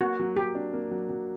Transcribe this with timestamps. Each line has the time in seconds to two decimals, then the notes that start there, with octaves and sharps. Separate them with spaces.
0.01 A#3 F#4
0.20 F#3
0.36 F#3 G4
0.55 D4
0.73 A#3
0.91 F#3
1.09 F#3